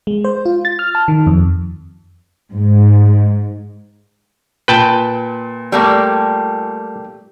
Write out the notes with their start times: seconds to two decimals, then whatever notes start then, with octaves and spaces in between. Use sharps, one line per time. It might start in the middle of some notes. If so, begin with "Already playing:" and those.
0.07 G#3
0.24 C5
0.45 F4
0.65 A6
0.79 F6
0.95 A5
1.08 D#3
1.27 F2
2.52 G#2
4.68 A#2 B4 G5 A5
5.72 G3 A3 A#3